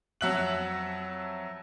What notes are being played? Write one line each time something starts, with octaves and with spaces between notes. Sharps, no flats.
F2 F#3 F#4 E5 F#6 F#7